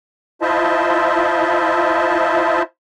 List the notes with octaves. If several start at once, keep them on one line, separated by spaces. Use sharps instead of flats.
E4 F4 C5 D#5 E5 A5